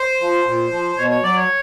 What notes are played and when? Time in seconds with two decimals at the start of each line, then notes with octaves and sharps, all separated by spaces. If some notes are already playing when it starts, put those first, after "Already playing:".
Already playing: C5
0.21 F3
0.46 A#2
0.71 F3
0.97 B2 C#5
1.10 C#5
1.23 F#3 D5
1.36 C#5